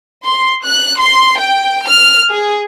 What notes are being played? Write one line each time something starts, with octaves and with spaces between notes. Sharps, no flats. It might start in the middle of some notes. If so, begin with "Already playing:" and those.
C6
F#6
C6
G5
F6
G#4